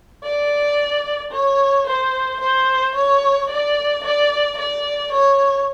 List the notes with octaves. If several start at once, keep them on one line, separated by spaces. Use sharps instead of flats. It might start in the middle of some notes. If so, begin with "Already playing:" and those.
D5
C#5
C5
C5
C#5
D5
D5
D5
C#5